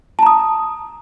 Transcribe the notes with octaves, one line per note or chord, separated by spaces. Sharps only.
A5 A#5 D#6